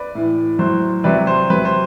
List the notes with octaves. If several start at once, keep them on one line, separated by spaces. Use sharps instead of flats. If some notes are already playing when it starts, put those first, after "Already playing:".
Already playing: B4 D5
A2 E3
A2 F#3 C5
C3 F#3 B4 D5
C5
C3 F#3 B4
C5